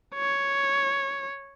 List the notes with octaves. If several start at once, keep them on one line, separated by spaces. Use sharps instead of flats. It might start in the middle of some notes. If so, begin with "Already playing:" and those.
C#5